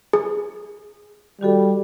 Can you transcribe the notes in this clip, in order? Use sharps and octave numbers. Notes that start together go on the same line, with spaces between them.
G#4
D#3 G3 F#4 A4